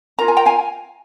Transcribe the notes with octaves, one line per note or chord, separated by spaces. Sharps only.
F4 A#4 A#5
G#5
G5 A#5
F5 G#5